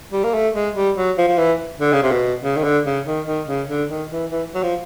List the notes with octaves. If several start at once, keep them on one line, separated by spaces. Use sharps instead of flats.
G3
A#3
A3
G#3
G3
F#3
F3
F3
E3
D3
C#3
C3
B2
C#3
D#3
D3
C#3
D#3
D#3
C#3
D3
D#3
E3
E3
F#3
F3